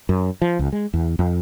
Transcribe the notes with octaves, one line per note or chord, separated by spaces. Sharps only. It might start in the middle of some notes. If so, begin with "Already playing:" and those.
F#2
F3
C#2
G#3
E2
F2